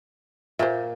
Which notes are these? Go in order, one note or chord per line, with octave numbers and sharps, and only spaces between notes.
A#2 C5 E5